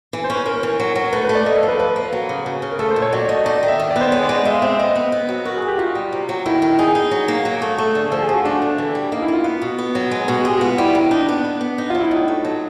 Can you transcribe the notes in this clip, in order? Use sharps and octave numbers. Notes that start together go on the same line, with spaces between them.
E3
C5
C#4
B4
C#4 A#4
E3
F#3
F#3
A3 B4
A3 B4
D5
A#3 D#5
A4
F3
B4
F3 B4
A#3
F#3
C#3
C#3
C#3
A#4
A3 A4
C5
A#2
C#5
F#3 D5
A3 D#5
D#4 D5
D#5
D#3
E5
D#3
D5
B3 C5
G#3 C#5
D5
G#3
D#5
G#3 E5
F5
C4 E5
B3 D#5
B3
B3
F#3
F#4 A#4
G#4
F#4
G4
D#4 F4
G3
C3
F#3
D#3 E4
D#3
D#4 G#4
D#4
F#3
A#3
F#3
A3
A3
D3
F3 A4
G#4
F3 F#4
A3 D4
D3
E3
G3
A#3 D#4
E4
A#3
F4
B3
B2
B3
F#3
G#3
B2
G#4
G#3 G4
F#4
B3 F4
G3 E4
D#3
D4 D#4
B3
B3
B3
D#4
F#3 F4
E4
A2 D#4
A3
F#3